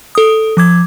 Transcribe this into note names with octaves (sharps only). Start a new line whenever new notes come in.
A4 D#6
F3 D6 G#6